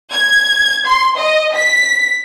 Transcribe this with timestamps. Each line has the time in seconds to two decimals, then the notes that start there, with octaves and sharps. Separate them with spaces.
0.12 G#6
0.87 C6
1.18 D#5
1.55 B6